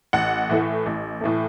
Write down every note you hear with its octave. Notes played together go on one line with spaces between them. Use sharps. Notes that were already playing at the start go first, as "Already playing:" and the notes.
A1 F#5
A2 E3 A3
A1
A2 E3 A3